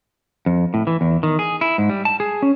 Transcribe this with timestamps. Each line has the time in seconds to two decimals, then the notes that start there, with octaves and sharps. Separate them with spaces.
0.46 F2
0.74 A2
0.87 E3
1.01 E2
1.23 D#3
1.39 G#4
1.61 E4
1.78 G#2
1.90 G3
2.05 A5
2.20 G#4
2.42 C#4